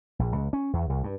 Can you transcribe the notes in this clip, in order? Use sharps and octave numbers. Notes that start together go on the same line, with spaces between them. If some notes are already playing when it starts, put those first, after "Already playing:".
A#1
C#2
C#4
E2
C2
G2